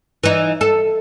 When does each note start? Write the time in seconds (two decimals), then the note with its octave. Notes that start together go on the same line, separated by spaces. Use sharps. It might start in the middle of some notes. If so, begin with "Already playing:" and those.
0.23 E3 D#4
0.61 A4